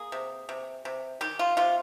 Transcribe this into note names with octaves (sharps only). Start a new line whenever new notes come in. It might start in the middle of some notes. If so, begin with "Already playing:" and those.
Already playing: A#3 G#4
C3
C3
C3
D#3 G4
F4
C3 F4